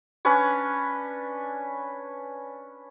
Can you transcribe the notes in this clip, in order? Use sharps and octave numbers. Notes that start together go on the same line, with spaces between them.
C#4 D4 B4 C#5